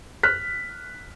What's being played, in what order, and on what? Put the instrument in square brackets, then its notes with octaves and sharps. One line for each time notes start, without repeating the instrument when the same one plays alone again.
[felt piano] F6 F#6 B6